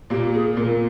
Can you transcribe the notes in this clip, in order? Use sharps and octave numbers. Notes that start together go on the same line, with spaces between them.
A#2 A#3 G4
G#4
A#2 A#3 A#4